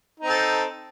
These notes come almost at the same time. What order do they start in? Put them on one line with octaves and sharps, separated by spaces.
D#4 C4 A4